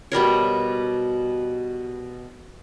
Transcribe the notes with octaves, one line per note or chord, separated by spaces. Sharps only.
B2 G3 A#4 C#5